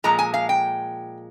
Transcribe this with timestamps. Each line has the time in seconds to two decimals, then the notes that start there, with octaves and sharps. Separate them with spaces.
0.04 A#2 F3 G#3 A#5
0.19 G#5
0.34 F5
0.49 G5